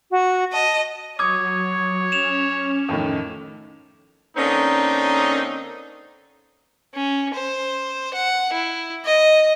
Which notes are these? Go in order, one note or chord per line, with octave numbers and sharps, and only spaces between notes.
F#4
D#5 A5
F#3 C#5 D6 D#6 G#6
C#4 E7 F7
F2 A2 D#3
D3 A#3 C4 C#4 D#4
C#4
C5
F#5
E4
D#5